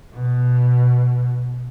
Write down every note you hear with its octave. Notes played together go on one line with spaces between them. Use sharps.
B2